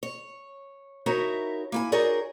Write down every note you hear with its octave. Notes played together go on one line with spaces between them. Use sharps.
C#5
D#4 E4 F#4 A#4 C#5 E5
A#3 E4 G#5
D#4 F#4 G#4 A#4 C#5 D5